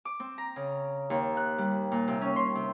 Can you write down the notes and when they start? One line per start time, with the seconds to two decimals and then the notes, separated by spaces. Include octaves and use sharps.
0.05 D6
0.20 C4
0.38 A#5
0.56 C#3
1.10 D#2
1.37 F#6
1.58 G3
1.92 A#2
2.08 C3
2.22 C#4
2.36 C6
2.55 C3